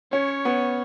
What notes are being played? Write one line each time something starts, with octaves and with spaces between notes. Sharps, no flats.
C#4 C#5
B3